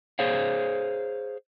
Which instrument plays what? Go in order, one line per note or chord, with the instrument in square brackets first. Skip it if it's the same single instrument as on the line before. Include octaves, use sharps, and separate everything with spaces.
[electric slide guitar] G#4 C5 C#5 F5